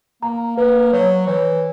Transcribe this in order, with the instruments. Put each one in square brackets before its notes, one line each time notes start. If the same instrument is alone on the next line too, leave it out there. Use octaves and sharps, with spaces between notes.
[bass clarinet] A#3 [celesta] A#5
[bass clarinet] A#3 [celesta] B4
[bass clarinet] F#3 [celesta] C#5
[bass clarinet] E3 [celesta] C#5